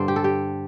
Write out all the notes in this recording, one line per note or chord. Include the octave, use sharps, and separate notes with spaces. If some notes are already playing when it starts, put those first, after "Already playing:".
Already playing: G2 D3 G3 C5 D5
G4
A4
G4